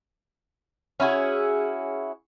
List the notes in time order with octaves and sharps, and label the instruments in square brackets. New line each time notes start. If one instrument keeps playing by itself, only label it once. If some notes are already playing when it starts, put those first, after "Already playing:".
[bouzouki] C#4 E4 F#4 G#4